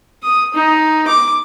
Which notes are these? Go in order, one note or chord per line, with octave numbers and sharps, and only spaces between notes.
D#6
D#4
D6